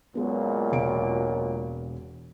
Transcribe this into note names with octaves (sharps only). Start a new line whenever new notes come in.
C#2 A#2 F#3 G#3 B3
E1 D7